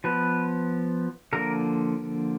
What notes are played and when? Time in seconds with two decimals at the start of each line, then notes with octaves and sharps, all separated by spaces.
0.04 F3 B3 B4
1.33 D3 F3 A#3 A#4